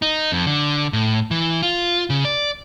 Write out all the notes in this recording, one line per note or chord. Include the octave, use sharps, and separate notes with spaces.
D#4
F2
D3
A2
E3
F4
C#3
D5